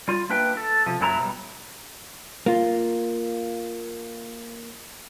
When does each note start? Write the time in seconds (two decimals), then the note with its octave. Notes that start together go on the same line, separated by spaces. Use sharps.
0.08 G3 F4
0.30 A#3 D4 B4 E5 G5
0.57 A4
0.86 C3 F3
1.00 F#2 A#2 F#3 E4 A5 A#5
1.19 B2 G3
2.46 A#3 F4